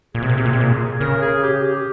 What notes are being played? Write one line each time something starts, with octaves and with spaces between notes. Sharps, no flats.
A#2 G#4
C3
A#2
C3
A#2
C3
A#2
C#3 A#4
G#4
G4
G4